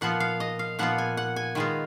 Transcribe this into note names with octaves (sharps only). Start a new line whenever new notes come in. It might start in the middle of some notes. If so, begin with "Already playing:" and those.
A#2 F3 B3 F4 F#5
F5
D#5
F5
A#2 F3 B3 F4 F#5
G#5
F#5
G#5
D#3 G#3 B3 F4